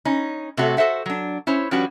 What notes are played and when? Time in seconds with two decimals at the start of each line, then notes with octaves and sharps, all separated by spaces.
0.05 C#4 D#4
0.57 C3 A3 F#4 A4 C#5
0.77 F#4 A4 C5 E5 F#5
1.06 F#3 D4
1.47 C#4 E4 C5 C#5
1.71 F3 G3 C#4 D4 F#4 B4